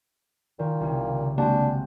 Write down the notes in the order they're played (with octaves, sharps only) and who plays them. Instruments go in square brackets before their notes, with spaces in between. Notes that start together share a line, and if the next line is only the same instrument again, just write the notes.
[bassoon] A#2 [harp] D#3
[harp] C2 C#3
[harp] G#3 C4 F#4 [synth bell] A#3 [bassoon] D4